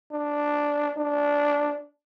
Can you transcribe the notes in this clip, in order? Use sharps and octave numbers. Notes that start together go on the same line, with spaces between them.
D4
D4